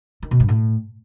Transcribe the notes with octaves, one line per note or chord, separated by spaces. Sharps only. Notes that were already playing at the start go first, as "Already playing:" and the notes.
D#3
B2
G2
A2